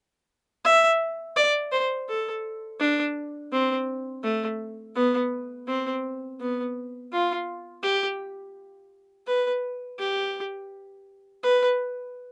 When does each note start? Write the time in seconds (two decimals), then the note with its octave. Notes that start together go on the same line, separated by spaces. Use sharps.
0.65 E5
1.36 D5
1.72 C5
2.09 A4
2.80 D4
3.52 C4
4.23 A3
4.95 B3
5.68 C4
6.40 B3
7.12 F4
7.83 G4
9.27 B4
9.99 G4
11.43 B4